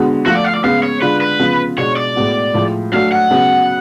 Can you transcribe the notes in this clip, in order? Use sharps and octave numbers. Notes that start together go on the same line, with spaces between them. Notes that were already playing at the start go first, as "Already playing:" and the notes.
Already playing: D3 G#3 B3 F#4
F3 A3 F4 F#4
D5
F5
D5
C#3 G#3 B3 F5
C#5
D3 G#3 D4 F4 B4
B4
C#3 F3 B3 F4
B2 G#3 D4 C#5
D5
A2 G#3 B3 F#4
A2 F3 G#3
F#3 A3 D4 F#4 F5
F#5
C#3 F#3 B3